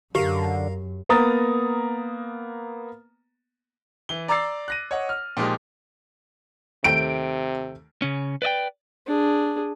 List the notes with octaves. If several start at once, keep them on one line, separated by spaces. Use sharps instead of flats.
F#2 D3 G4 A#4 F5
A#3 B3 A#5 D#6 A6
E3 G7
D5 A#5 D6 E6 A6 C7
F#6 A#6 D#7
C#5 D#5 F#5
F6
A#2 F3 G#3 D#4 G4
D#2 C3 A3 G5 D7
C#3 C#4
B4 D5 D#5 G5
D4 G#4